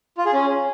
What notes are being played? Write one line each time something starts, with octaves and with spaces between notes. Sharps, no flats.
F4
G#4
C#4